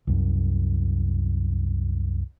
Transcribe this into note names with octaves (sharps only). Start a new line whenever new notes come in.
C2 F#2